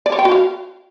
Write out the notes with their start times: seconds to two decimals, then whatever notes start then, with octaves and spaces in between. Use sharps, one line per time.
0.06 D5
0.12 C#5
0.19 G5
0.25 F#4
0.32 F5